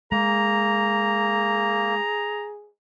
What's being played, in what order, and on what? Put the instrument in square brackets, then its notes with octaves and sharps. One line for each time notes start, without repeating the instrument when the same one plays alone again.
[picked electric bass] G#3 [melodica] A#3 [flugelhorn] G#4 [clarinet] A#5